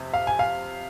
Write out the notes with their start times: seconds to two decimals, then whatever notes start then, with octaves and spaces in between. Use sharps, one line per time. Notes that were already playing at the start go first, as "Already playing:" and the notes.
Already playing: F2 C3
0.14 F5
0.27 G#5
0.39 F5